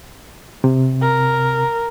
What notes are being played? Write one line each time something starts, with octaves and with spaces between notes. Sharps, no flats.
C3
A#4